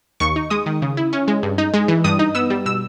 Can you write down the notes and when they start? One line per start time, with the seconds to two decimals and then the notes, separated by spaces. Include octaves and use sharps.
0.20 D#2 C#6
0.36 D#4
0.50 G#3 D#6
0.66 D#3
0.82 C#3
0.97 E4
1.13 C#4
1.28 G#3
1.43 G2
1.58 D#4
1.74 G#3
1.88 E3
2.04 G2 D#6
2.19 D#4
2.35 B3 E6
2.50 G3
2.66 B2 E6